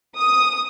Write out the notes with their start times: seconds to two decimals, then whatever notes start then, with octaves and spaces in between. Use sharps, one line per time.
0.16 D#6